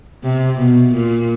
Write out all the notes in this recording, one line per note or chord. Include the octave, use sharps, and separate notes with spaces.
C3
B2
A#2